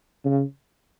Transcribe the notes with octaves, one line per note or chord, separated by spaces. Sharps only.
C#3